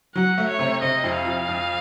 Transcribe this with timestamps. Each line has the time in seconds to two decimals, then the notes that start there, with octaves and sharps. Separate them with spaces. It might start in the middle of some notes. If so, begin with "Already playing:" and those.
0.15 F#3 F#5
0.38 A3
0.48 C#5
0.59 C3
0.82 C3 D#5
1.04 F2
1.15 F5
1.25 F3
1.48 F2